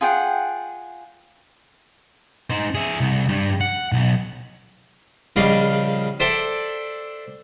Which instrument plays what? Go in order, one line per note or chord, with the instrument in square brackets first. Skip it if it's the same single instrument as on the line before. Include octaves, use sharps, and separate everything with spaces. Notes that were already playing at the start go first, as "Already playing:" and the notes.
[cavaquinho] F4 G#4 F#5 G5
[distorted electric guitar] D#4 C5
G#4 E5
C2
G2 G3
F#5
B1
[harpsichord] A#1 C#3 G3 D4 D#5 F5
D4 A4 C5 D5 E5 G5